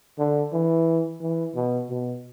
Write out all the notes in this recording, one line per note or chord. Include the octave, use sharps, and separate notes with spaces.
D3
E3
E3
B2
B2